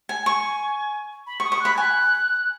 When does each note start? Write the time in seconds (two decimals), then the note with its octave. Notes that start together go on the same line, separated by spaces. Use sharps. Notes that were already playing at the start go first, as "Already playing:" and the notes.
0.09 G#5
0.26 G#5 C#6
1.27 B5
1.40 C#6
1.44 D#6
1.52 C#6
1.60 B5 F#6
1.77 G#5 F#6